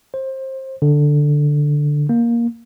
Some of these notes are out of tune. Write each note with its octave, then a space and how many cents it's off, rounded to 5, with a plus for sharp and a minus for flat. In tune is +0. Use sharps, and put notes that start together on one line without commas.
C5 +25
D3 +0
A#3 +10